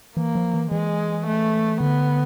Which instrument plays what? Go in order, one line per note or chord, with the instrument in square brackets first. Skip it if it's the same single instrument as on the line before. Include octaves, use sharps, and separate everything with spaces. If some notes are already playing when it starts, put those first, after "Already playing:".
[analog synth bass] E3 [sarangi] A#3
[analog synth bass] F3
E3
[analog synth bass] E3 [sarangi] G#3
[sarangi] A3
[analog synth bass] D3 [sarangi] B3